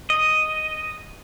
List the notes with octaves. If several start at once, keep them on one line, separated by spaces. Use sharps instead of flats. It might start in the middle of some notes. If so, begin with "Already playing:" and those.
D#5